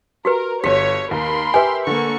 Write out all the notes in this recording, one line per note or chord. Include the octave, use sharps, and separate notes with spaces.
F#4 G4 A#4 B4
G1 G4 C#5 B6
D#2 A#4 B5 C6
G4 B4 E5 G#5
D3 A#3 C#6